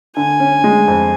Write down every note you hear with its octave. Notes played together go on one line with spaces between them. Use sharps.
D3 G#5
C#4
G#3
F2